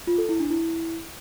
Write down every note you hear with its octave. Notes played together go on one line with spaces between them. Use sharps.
F4
A4
E4
D4
E4